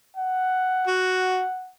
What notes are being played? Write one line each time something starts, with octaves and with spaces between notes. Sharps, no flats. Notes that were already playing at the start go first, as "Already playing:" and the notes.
F#5
F#4